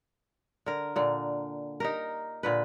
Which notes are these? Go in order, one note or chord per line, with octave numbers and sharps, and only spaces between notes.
D3 A#4
A#2 D3
D#4 G4 A#4
A#2 D3 B4